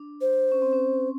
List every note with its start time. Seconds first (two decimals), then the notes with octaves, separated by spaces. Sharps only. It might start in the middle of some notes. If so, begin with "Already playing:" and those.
Already playing: D4
0.21 C5
0.52 C#4
0.62 C4
0.73 C#4